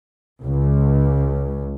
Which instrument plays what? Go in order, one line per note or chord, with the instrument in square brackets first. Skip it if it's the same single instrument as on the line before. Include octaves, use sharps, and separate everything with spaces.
[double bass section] C#2